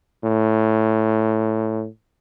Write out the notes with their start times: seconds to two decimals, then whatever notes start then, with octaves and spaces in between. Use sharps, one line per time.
0.24 A2